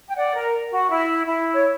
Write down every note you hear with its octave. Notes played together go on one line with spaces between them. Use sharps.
G5
D5 F#5
A#4
F#4
E4
E4
C#5